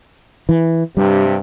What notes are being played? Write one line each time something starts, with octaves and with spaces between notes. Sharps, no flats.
E3
G2 C3 G3